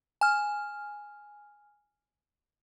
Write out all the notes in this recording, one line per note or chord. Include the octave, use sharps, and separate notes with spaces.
G#5 F6